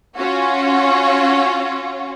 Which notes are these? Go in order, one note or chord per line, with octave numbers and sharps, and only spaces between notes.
C#4 F4 F#4